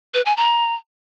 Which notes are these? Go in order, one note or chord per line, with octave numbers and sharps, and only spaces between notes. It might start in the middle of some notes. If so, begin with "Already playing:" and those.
B4
G#5
A#5